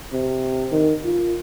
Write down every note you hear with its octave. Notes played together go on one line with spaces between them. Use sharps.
C3
D#3
F4